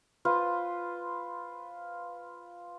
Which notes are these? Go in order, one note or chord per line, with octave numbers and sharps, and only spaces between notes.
F4 B4 C5